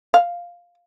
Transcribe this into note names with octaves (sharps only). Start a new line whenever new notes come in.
F5